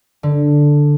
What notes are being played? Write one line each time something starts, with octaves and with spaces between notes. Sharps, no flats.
D3